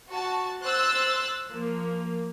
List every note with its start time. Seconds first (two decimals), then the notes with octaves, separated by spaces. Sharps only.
0.10 F#4 A5
0.63 C5 E6 F#6 A6
1.48 F3 A#3